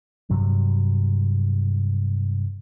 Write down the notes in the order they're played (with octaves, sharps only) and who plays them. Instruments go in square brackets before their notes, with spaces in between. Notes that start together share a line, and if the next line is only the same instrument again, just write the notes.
[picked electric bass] G2 C3 F#3